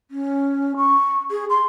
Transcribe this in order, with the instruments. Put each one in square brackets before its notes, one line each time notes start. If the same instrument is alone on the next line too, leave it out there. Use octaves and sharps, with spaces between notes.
[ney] C#4
C#6
G#4
C6